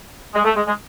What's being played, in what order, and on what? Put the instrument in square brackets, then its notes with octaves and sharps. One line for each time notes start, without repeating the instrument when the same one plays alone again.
[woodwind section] G#3
A3
G#3
G#3